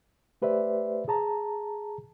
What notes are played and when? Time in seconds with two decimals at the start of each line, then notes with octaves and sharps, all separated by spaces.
0.42 A3 G4 B4 C5 D5 E5
1.08 G#4 A5 A#5